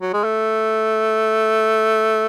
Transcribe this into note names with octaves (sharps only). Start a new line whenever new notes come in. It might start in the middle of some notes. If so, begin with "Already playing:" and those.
F#3
G#3
A3